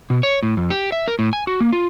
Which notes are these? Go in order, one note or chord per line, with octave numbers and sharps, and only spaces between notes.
B2
C#5
A2
F2
G4
E5
A#4
A2
G#5
F#4
A#3
F4